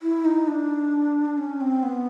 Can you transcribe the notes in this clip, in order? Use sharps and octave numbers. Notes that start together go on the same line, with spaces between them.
E4
D#4
D4
C#4
C4
B3